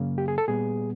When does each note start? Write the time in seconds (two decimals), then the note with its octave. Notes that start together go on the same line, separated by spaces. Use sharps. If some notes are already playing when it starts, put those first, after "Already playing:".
Already playing: F#2 C#3 F#3 A#3
0.18 G4
0.28 G#4
0.38 A4
0.48 A#2 G3 B3 G#4